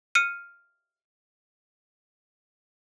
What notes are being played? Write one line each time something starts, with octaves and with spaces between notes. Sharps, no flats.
F6 C#7 D#7